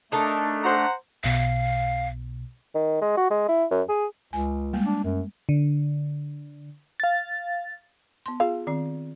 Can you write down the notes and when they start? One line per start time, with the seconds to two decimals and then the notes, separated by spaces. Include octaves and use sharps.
0.12 A3 D4 D#4 A4 A#4
0.64 C5 F#5 A#5
1.24 B1 B2 F5
2.75 D#3
3.02 G#3
3.17 F#4
3.30 G#3
3.48 E4
3.71 F#2
3.89 G#4
4.33 C#2 G#5
4.73 G3 G#3 A#3
4.86 D4
5.04 F#2
5.49 D3
7.00 F5 A6
8.26 B3 C6
8.40 F4 G#4 F5
8.67 D#3 C4